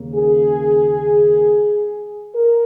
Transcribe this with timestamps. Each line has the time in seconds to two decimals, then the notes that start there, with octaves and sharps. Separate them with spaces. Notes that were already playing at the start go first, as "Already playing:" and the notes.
Already playing: D#2 C#3 A#3
0.15 G#4
2.35 A#4